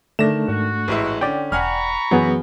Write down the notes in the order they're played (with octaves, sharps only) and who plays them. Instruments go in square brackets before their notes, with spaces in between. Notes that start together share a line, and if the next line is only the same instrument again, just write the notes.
[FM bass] D3 [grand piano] D#3 A#6 E7 [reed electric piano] A3 D4
[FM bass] G#2 [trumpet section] F#4
[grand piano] A1 G#3 E4
[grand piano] D3 C#4 [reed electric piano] D5 G5
[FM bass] E1 [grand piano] F#5 G#5 F6 [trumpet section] A#5 B5 C#6
[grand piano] F#2 [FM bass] E3 [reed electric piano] F#3 B3 G#4